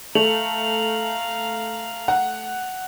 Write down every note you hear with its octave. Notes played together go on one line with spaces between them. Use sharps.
A3 F5 A#5 F7 F#7
F#5